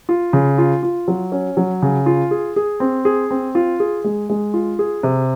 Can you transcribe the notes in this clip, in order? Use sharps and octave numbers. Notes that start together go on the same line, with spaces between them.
F4
C#3
F4
F4
F#3
C#4
F#3
C#3
F4
G#4
G#4
C4
G#4
C4
F4
G#4
G#3
G#3
F4
G#4
C3